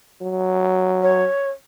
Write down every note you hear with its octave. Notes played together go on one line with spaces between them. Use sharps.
F#3
C#5